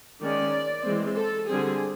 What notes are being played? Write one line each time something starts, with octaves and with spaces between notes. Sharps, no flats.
D#3 G#3 C#4 D5
E3 G#3 C4
A4
D3 G3 C4 G#4